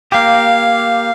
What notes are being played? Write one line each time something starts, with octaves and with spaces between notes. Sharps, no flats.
A#3 G4 F5